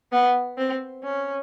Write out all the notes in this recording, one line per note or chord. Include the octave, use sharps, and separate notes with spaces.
B3
C4
C#4